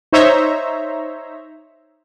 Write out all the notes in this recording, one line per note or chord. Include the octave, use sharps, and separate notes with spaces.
D#4 C5 C#5 E5 A#5